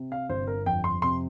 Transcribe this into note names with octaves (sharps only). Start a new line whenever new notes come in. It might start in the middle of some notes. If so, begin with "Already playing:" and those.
Already playing: C3
F5
G1 C5
A#4
F2 G5
C6
C3 C6